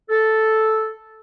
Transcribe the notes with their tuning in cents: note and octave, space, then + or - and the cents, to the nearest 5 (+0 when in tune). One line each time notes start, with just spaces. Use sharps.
A4 -5